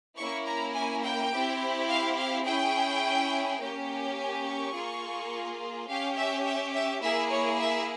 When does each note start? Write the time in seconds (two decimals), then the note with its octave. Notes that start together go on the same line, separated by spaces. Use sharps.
0.17 A#3 C#4 E4 C#6
0.46 A#5
0.74 G#5
1.03 G5
1.31 C4 E4 G4
1.88 F5
2.17 F5
2.45 C#4 E4 G#4 G5
3.60 A#3 C#4 G4
4.17 G#5
4.46 C#6
4.74 A#3 F4 G#4
5.88 C#4 G4 F5
6.17 E5
6.45 E5
6.73 E5
7.02 A#3 E4 G#4 E5
7.31 C#5
7.59 E5